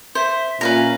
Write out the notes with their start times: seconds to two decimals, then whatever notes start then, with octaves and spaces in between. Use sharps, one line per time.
0.15 C5 E5
0.61 A#2 C#4 B4 F5 A#5